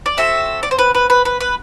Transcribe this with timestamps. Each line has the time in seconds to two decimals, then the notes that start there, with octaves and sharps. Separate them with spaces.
0.06 D5
0.17 C4 F#4 A4 E5
0.63 D5
0.71 C5
0.79 B4
0.95 B4
1.10 B4
1.25 B4
1.41 B4